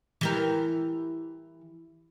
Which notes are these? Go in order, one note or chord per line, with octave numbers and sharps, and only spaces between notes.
E3 G4 A#4